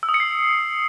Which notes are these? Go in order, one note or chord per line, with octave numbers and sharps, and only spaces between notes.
E6
D#6
C#7
C7